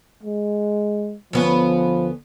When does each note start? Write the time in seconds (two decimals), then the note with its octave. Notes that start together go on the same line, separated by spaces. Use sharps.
0.23 G#3
1.33 D2 F3 B3 C#4